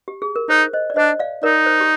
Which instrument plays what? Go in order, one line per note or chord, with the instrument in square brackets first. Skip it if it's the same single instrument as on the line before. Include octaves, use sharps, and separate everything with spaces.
[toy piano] G4
G#4
A#4
[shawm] D#4 [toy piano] C5
[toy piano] C5 D#5
D5
[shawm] D4 [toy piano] C5 D#5
[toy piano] D5 F5
[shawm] D#4 [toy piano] A#4 D5
[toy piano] C5
G4